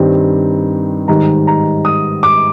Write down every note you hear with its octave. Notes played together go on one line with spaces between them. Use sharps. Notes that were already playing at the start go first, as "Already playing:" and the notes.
Already playing: G2 D#3 G3 C4
G#2 D#3 G3 A#5
A#5
D#6
D6